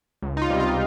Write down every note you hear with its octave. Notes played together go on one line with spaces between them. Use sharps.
C#2
D#4
F4
C3 G3
F4